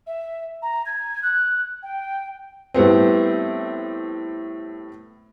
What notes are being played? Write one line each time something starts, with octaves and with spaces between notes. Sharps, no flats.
E5
A#5
G#6
F#6
G5
A2 G3 B3 C4